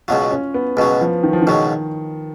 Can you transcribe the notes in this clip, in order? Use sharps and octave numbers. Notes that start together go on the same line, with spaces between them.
C#2 B2 F#3 F4
C#4
B3
C#2 B2 F#3 B3
F3
D#3
F3
D#3
C#2 B2 F#3